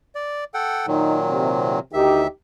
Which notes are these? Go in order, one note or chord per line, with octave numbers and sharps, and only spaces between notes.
D5
A4 F#5 G5
A#2 D#3 F#3 D#4
C3
D2 D#3 D#4 G4 E5